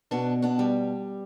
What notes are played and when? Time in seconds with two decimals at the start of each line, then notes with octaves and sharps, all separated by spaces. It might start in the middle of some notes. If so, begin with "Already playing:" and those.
0.11 B2 B3 D4
0.42 B3 D4
0.59 G3